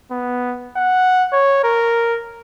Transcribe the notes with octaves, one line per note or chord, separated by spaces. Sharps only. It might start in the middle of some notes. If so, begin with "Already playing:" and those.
B3
F#5
C#5
A#4